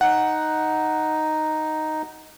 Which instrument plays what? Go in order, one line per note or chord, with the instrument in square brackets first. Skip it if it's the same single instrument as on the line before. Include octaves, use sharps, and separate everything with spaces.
[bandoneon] D#4 [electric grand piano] F#5